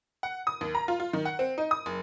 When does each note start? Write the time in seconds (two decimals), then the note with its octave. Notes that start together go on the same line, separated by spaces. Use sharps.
0.23 F#5
0.47 D#6
0.61 D#2
0.75 A#5
0.88 F4
1.00 F4
1.13 D#3
1.25 F#5
1.39 C4
1.58 D#4
1.71 D#6
1.86 F#1